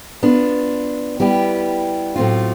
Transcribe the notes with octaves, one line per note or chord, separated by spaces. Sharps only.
B3 D4 F4
G3 B3 E4 G4
A2 F#3 A3 C4 F4